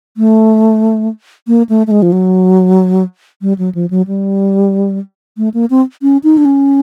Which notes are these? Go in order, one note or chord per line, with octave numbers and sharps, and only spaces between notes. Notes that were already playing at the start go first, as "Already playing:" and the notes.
A3
A#3
A3
A3
G#3
F3
F#3
G3
F#3
F3
F#3
G3
A3
A#3
C4
C#4
D#4
D4
C#4